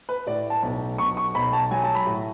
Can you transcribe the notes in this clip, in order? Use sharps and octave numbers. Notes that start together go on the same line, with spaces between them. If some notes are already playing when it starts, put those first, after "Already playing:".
B4
A2 D5
A5
B1
B1 C#6
C#6
B1 B5
A5
F#3 G#5
A5
B5
A2